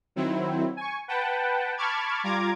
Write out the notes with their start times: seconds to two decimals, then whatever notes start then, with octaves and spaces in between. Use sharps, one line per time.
0.16 D#3 F#3 C4 E4
0.77 G#5 C#6
1.08 B4 F#5 G5 A5
1.77 A5 B5 C#6 D6 F6 G#6
2.24 G3 F4 A#5 D6 G#6